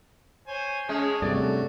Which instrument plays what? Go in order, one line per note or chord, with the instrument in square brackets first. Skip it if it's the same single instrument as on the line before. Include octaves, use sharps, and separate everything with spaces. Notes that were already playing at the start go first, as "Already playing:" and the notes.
[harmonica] C5 C#5 G#5
[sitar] G#3 C#4 [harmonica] G#4 A4
[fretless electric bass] G2 C3 [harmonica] F#3 [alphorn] A3 [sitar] D5